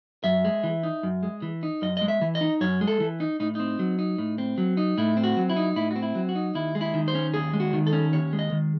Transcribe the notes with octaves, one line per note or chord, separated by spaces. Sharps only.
F#2 E5
G#3
E3
D#4
F#2
G#3
E3
D#4
F#2 D#5
G#3 D#5
E5
E3
D#5
D#4
F#2 C#5
G#3
A4
E3
D#4
A2 D#4
C4 D#4
F#3
D#4
A2
C4
F#3
D#4
A2 E4
C4
F#4
F#3
E4
D#4
A2 E4
C4 F#4
E4
F#3
F#4
D#4
D#2 E4
G#3
E4
D#3
C5
C#4
D#2 G#4
G#3
F#4
D#3
A4
C#4
D#2 C#5
G#3
D#5
D#3